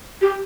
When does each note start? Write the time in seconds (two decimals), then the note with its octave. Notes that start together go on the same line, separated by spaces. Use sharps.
0.22 G4